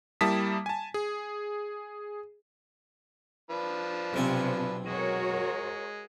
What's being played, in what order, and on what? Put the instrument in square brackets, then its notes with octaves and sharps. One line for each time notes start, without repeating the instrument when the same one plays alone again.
[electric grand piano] G3 A#3 E4 A5 D#6 B6
G#5 A5
G#4
[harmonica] F3 D4 B4
[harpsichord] B1 C4 G#5 [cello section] C3
[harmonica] G#3 [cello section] F#4 A#4 C#5